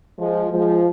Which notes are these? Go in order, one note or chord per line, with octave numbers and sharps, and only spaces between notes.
F3 G#3
F3 G#3